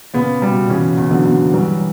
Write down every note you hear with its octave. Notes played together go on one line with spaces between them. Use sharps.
A#2 C#3 B3
B2 G3
C#3 E3 C#4
E2
D3 F#3
E2
E3 F#3 G3